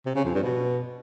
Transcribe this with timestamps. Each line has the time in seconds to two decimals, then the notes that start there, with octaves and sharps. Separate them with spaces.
0.06 C3
0.15 C#3
0.25 F2
0.34 G2
0.44 B2